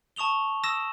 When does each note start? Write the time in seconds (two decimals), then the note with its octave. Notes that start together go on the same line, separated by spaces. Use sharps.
0.16 A5 C#6 D#6 F7 G7
0.64 D#6 E6 A#6 E7